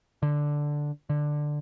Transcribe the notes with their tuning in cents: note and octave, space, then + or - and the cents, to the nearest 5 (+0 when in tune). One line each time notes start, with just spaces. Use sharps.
D3 +0
D3 +10